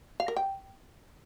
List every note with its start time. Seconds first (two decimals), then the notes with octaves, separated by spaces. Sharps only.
0.20 F5
0.28 A#4
0.37 G5